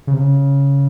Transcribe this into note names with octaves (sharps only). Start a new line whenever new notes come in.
C#3
C3
C#3